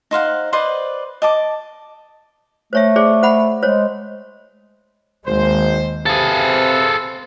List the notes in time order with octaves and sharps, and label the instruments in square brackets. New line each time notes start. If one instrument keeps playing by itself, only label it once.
[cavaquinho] D#4 C5 F5 F#5
B4 C5 D5 D#5
D#5 A5 D6
[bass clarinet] A3 [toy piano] C5 C#5 E5
[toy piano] G#4 C5 D5
C5 F#5 B5
[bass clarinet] G#3 [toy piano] C5 C#5
[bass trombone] G#1 [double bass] D#2 G#3 [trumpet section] C5
[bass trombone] C3 [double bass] C4 [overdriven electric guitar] G#4 A4 [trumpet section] B4 F5